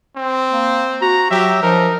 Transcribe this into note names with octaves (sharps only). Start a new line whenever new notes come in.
C4
A#3
F#4 A#5
F#3 G4 E5
F3 D#4 A#4